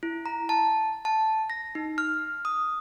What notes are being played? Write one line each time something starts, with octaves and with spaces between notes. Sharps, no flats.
E4
A#5
A5
A5
A#6
D#4
F6
D#6